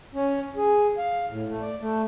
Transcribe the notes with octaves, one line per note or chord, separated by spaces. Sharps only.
C#4
G#4
F5
A2
A3
D5
A3